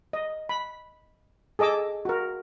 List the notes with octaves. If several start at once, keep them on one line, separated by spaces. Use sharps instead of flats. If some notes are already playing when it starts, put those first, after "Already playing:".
D#5
B5
G#4 A4 D#5 D6 E6
F#4 A#4